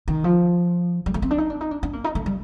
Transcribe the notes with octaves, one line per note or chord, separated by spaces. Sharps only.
D#3
F3
G3
A3
C4
D4
D#4
D4
D#4
D4
D4
A#3
D#4
A3
G3